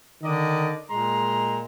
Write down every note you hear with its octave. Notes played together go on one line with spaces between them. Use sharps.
D3 D#3 D5 D#5
A#2 G#3 A#5 C6